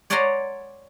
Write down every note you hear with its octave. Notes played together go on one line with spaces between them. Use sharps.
C#5 D5 F#5 G#5 A#5 C6